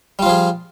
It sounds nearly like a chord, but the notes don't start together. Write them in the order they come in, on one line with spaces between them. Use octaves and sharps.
G3 F4 F3 G#4